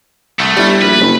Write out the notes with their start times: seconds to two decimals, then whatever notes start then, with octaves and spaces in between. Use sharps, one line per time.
0.40 C2 A3
0.57 G1 G3 E4
0.82 A#1 B4
1.01 F#1